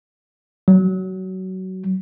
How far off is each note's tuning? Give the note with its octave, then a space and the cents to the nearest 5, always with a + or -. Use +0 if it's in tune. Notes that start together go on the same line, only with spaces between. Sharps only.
F#3 +20